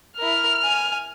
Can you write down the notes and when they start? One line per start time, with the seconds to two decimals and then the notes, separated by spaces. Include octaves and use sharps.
0.19 E4 A#4 F6
0.64 G#5